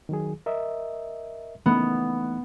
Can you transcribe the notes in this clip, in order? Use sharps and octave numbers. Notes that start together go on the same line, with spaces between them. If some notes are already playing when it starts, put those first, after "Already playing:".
D#3 F#3 G#4
A#4 D#5 E5
E3 A3 B3 D#4